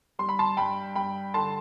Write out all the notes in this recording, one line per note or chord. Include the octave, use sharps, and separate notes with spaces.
G3 C6
B5
A5 C6
G2 G5 B5
G2 G5 B5
D3 A5 C6